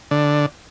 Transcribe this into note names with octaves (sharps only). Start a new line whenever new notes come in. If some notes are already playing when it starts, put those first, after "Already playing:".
D3